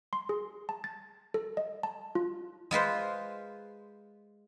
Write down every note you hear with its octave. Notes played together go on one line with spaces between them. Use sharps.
C6
G#4
A5
A6
A4
D#5
A5
F4
G#3 F4 B4 C5